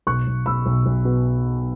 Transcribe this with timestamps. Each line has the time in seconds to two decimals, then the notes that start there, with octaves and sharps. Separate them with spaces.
0.07 B1 C#6 F#6
0.27 B1
0.46 B1 B5 E6
0.66 B1
0.86 B1
1.05 B2